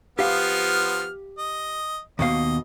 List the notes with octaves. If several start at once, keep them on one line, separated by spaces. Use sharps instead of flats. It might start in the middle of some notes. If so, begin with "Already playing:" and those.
F3 B3 G4 F5 F6
D#5
D#2 B2 D#5 F5